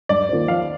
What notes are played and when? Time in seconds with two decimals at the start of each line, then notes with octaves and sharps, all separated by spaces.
0.09 G2 D5
0.29 D#3 A#3 F4 C5
0.48 F3 F5